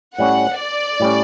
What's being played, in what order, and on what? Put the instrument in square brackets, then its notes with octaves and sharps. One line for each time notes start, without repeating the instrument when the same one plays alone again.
[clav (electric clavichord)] A2 G3 C#4 [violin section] F#5
[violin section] D5
[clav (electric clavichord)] A2 G3 C#4